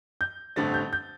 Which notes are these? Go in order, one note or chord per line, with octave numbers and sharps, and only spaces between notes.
G6
A1 G2 D3 A3 C4 A6
G6
G6